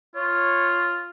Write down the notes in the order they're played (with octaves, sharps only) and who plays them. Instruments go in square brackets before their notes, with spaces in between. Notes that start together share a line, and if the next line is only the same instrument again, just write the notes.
[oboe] F4 [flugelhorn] C#5